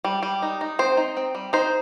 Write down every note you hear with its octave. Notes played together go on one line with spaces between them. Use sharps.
G3
G3
D#4
D#4
C4 C5
D#4
C4
G3
D#4 C5